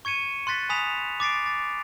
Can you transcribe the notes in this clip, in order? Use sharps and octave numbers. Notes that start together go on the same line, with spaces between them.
C#6 G#6 C#7 D#7 E7
C6 F#6 A6 B6
G#5 B5 D#6 B6 E7 F7
D6 A6 C7 D7
A6